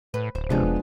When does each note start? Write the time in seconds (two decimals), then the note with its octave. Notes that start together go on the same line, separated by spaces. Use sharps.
0.14 A2 B4
0.35 D1 C5
0.50 C3 F3 G#3 B3 D4 D#4
0.63 E1